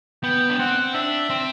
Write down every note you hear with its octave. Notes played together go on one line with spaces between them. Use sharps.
B3 G5
D4
C4 F#5
D4 E5
C4